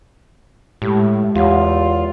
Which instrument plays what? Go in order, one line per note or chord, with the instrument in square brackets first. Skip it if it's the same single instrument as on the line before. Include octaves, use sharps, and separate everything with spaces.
[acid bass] A2 [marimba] G#3 G4
[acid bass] E2 [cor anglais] F4 [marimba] G4 C#5 F#5